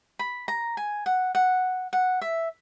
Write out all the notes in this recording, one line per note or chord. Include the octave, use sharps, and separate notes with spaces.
B5
A#5
G#5
F#5
F#5
F#5
E5